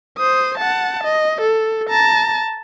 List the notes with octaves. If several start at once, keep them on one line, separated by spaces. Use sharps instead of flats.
C5 D#6
F#5 A5
D#5
A4
A5 A#5